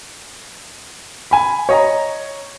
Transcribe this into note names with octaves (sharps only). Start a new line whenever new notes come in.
G#5 B5
C#5 D#5 A#5